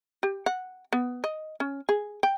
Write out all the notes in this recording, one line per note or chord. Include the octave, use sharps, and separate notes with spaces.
G4
F#5
B3
D#5
C#4
G#4
G5